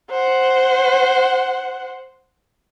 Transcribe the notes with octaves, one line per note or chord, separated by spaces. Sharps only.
C5 F#5